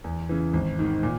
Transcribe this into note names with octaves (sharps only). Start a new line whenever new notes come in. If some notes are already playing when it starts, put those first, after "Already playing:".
E2
C#3 E3
G#1
G#2 D#3
A#2